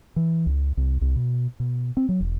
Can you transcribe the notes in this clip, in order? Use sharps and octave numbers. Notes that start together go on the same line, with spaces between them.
E3
C#2
C2
C2
B2
B2
C4
F#3
E1